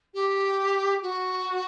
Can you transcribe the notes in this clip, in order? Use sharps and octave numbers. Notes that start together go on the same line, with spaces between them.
G4
F#4